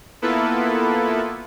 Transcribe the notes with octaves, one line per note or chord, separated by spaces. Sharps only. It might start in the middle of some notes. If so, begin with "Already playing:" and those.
A#3 B3 E4 F4 A4 B4